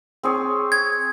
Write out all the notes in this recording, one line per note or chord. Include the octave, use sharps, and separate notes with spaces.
C4 G#4 C#5
G#6